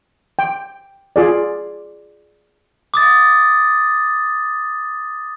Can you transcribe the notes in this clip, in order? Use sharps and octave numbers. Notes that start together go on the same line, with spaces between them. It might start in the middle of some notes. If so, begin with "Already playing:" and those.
G5
F4 G#4 D5
D6 D#6 A6